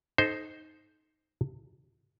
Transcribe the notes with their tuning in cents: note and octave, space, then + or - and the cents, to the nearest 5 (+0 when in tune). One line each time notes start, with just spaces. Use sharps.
D#4 +0 A4 -30 C5 +0